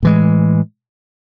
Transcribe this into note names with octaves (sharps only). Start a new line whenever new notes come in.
A2 E3 G#3